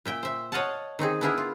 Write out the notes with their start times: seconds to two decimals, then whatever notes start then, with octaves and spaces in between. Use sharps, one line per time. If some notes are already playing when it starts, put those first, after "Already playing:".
0.05 A#2 E5 G5
0.23 C5 E5
0.52 C#5 D#5 F5 F#5 A5
0.99 D#3 C4 D#4 G#4
1.21 B3 D4 E4 G#4 A#4 E5
1.38 F4